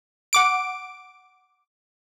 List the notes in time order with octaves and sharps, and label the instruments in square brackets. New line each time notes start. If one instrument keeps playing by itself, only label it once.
[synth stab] F#5 D6 D7